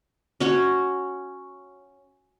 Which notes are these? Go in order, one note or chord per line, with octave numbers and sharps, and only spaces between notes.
C#4 F#4 C#5